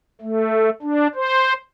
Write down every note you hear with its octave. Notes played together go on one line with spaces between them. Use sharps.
A3
D4
C5